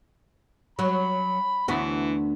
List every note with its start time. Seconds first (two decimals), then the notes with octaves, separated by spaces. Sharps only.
0.79 F#3 B5
1.68 D2 E3 B3 F#4